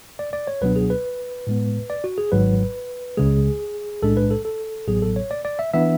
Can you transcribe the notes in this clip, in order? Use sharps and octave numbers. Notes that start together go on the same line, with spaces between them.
D5
D5
C#5
C#2 B2 F#3 B3 D4 B4
G#4
B4
A2 G#3 B3
D5
F#4
G#4
G#1 G#2 F#3 B4
C#2 C#3 G#3 G#4
B1 A2 G#3 D4 A4
B4
A4
A4
A1 A2 F#3 B3 G#4
A4
C#5
D5
D5
E5
E3 B3 D4 E5